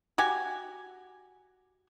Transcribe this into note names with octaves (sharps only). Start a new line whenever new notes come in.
F#4 G4 G#5